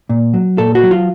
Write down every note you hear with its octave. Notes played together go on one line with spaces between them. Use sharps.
A#2
F#3
A#2 A4
F#4
F#3
F4